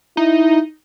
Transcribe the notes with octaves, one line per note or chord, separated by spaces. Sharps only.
D#4 E4